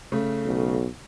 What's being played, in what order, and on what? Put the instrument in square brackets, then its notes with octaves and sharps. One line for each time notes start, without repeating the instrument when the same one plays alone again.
[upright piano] C#3 A3
[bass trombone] B1